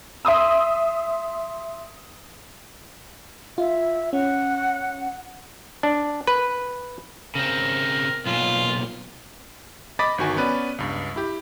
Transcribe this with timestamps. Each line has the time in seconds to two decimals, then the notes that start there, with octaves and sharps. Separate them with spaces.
0.25 E5 C6 D#6 E6
3.58 F4 E5
4.13 C#4 F#5
5.83 D4
6.27 B4
7.35 C#3 C4 A#4
8.26 B1 A#2 F4
9.99 D#5 B5 D6 A6 B6
10.18 G1 D#3 F#4 G#5
10.37 B3 C#4 B4 D5
10.78 C#2 G2
11.16 E4 G4